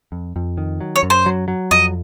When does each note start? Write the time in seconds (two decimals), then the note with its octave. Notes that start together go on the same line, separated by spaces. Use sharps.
0.12 F2
0.36 F2
0.58 D#3
0.81 F#3
0.96 C#5
1.03 F#2
1.10 C5
1.26 F#3
1.48 F#3
1.71 F2 D#5